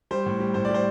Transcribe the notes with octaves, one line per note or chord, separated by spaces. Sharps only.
G3 C5
A2
G3
A2 C5
G3 D5
C5